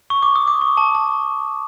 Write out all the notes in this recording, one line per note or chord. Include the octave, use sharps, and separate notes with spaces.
C#6
D6
D#6
D6
C#6
A5
A5